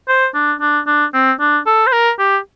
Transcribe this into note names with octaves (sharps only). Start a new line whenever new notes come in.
C5
D4
D4
D4
C4
D4
A4
C5
A#4
G4